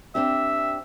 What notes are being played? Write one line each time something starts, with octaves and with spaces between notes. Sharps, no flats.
C4 D4 G4 E5